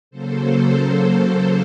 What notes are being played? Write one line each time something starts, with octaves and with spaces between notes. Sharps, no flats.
C#3 F#3 A#3 A4 C5